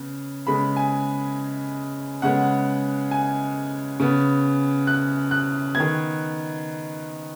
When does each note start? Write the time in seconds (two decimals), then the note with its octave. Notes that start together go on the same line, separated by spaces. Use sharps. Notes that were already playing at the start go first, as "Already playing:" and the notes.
Already playing: C#3 B3
0.47 C#3 G#3 B3 B5
0.76 G#5
2.22 C#3 G#3 B3 F#5
3.11 G#5
4.00 C#3 B3
4.87 F#6
5.31 F#6
5.75 D#3 B3 G#6